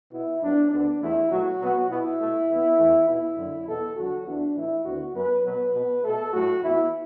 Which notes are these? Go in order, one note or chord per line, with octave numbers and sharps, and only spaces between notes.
B2 B3 E4
F#2 F#3 B3 D4
D2 D3 B3 D4
E2 E3 A3 E4
B2 F#3 A3 F#4
B2 F#3 B3
B2 B3 E4
B2 A3
E2 E3 B3
E2 E3 A3
B2 B3 E4
F#2 D3 F#3
E2 B2 B3 A4
E2 D3 F#3 F#4
E2 E3 B3 D4
A2 E3 A3 E4
D2 D3 B3 F#4
F#2 F#3 B3 B4
B2 F#3 B3 B4
B2 B3
B2 A3 A4
A2 F#3 A3 F#4
E2 E3 B3 E4